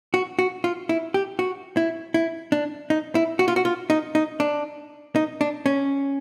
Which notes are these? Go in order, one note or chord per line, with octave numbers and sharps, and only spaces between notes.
F#4
F#4
F4
E4
G4
F#4
E4
E4
D4
D#4
E4
F#4
F4
F#4
F4
D#4
D#4
D4
D#4
D4
C#4